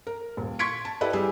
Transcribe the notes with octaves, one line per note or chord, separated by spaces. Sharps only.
A#4
D#1
C6 C#6 G#6 B6 C#7 D7
A5
E4 G4 A4 B4 D5
G3 G4 G#4 E6